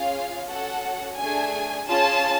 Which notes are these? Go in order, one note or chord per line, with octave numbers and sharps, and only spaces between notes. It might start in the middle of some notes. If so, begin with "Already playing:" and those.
Already playing: C#4 F4 G#4 F5
C#4 F#4 A4 F#5
A3 D4 G#4 G#5
C#4 F4 G#4 A5